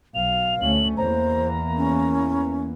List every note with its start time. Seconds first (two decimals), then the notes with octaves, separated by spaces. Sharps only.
0.15 B1 F5 F7
0.61 D2 A3 C#4 F#7
0.97 E2 E3 A#3 C5 A#5
1.77 C#4